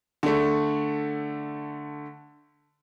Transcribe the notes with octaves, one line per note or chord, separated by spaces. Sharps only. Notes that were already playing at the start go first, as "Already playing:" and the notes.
D3 A3